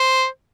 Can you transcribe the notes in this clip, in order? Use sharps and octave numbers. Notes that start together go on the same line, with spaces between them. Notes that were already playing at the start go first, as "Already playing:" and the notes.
Already playing: C5